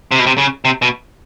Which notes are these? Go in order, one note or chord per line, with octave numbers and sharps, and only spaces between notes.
C3
B2
C3
C#3
C3
B2